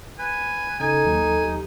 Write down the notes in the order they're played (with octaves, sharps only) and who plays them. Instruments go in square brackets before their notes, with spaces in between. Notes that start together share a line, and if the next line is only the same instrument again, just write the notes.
[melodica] B4 [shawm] G#5
[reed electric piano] C#3 G#6 [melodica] D#4 [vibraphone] A4 [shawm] G#5
[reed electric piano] D#2 F#3
[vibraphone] G4